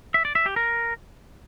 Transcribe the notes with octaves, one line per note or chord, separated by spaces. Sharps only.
E5
D5
E5
G4
A#4